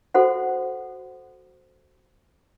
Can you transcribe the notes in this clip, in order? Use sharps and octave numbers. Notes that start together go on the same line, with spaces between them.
F#4 A4 C5 F#5